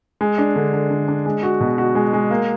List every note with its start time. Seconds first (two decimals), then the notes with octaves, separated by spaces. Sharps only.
0.21 G#3
0.38 D4
0.56 D3
0.73 D3
0.90 D3
1.08 D4
1.26 G#3
1.43 F#4
1.60 B2
1.78 F#4
1.95 G#3
2.13 G#3
2.31 A#3